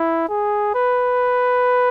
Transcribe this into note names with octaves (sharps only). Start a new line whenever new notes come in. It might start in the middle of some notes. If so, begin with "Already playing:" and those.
Already playing: E4
G#4
B4